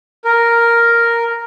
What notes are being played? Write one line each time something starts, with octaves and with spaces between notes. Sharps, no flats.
A#4